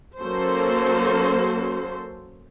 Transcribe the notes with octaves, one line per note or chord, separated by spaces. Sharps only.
F#3 A#3 C#4 F#4 A4 C5